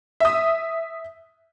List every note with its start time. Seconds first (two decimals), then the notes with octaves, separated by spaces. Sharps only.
0.20 E5 D#6